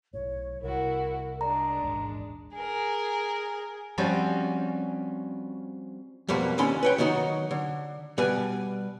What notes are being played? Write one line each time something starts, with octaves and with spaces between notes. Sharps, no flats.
B1 A2 C#5
C2 E4 F#4 A#4
G#3 D4 D5 A#5
D#1 A1 G#2
G#4 A#4
F3 G3 C4 C#4 F#4
F2 B2 F3 G3 A#3
D#2 D3 C#4 B5 C6
B4 C#5 G5
D#3 F#3 D#4 F#4
D3
B2 G3 B4 D5 G#5